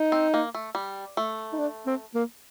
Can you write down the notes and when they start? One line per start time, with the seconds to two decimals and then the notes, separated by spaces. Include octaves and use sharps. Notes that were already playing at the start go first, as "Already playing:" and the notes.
Already playing: D#4
0.12 C4
0.34 A#3
0.54 A3
0.75 G3
1.17 A3
1.53 D#4
1.58 D4
1.86 C4
2.15 A#3